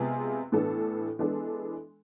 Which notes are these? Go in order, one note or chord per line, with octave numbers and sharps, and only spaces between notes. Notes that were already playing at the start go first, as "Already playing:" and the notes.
Already playing: C3 G#3 B3 F4 G#4
A2 E3 B3 D4 A4
E3 G#3 B3 D4 A4